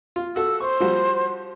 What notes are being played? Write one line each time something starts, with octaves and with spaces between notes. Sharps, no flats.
F4
F#4 A4 E6
C5 C#6
F3 G3 F#4